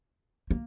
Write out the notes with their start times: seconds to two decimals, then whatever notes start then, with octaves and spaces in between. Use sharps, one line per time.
0.51 A#3